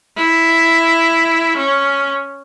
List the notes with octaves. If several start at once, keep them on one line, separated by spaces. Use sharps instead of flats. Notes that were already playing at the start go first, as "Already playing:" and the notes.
E4
C#4